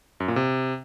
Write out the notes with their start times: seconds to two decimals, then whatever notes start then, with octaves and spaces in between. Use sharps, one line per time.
0.20 F#2
0.28 A#2
0.36 C3